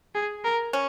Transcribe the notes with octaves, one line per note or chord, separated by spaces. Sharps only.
G#4
A#4
C#4